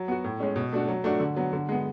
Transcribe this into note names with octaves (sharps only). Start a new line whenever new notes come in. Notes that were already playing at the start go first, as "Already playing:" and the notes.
Already playing: F#3
B3 F#4
A2
G#3 C#4
B2
A3 D4 F#4
F#3
A3 D4 F#4
D3
F#3 B3
D3
G#3 B3